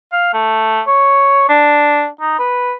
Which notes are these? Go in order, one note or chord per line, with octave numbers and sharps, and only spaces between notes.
F5
A3
C#5
D4
D#4
B4